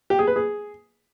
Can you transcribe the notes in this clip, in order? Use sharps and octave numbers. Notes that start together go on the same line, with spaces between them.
G4
G#4
B4
G#4